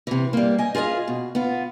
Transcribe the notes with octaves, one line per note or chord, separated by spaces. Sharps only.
C3 E3
G3 A#3
D#5 G#5
F4 G#4 B4 D#5 F5
B2
B3 F4